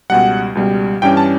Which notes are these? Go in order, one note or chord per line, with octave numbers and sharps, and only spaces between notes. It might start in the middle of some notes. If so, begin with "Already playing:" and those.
C#2 B2 G3 F#5
C#2 B2 G3
G2 E3 G3 C#4 G5
A5